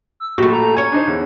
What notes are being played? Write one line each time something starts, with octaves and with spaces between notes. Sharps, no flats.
E6
A#1 A3 F#4 G4
A#5
C#4 C#5 G#6
D4 D#4 C5
E2